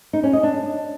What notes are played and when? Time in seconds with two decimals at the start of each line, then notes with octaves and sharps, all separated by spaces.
0.13 D#4
0.23 C#4
0.33 D#5
0.43 D4